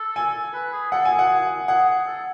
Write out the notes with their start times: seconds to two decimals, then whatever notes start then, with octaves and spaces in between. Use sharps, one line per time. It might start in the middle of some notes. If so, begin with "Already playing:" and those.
Already playing: A4
0.16 G#5
0.54 B4
0.73 G#4
0.92 A4 F#5
1.05 G#5
1.11 G#4
1.19 F#5
1.68 G#4 F#5
2.07 A4